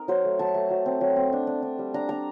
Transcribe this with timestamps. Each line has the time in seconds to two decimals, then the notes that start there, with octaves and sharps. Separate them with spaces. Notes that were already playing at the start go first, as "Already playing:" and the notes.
Already playing: C4 D#4 A#4
0.08 F#3 C5
0.25 A3
0.39 F#3 A5
0.54 A3
0.70 F#3
0.86 C4
1.01 F#3
1.16 C4
1.33 D4
1.47 D4
1.63 D4
1.79 G3
1.94 D4 A#5
2.09 D4 A#5